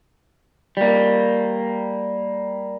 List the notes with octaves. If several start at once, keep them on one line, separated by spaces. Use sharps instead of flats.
G3 A#3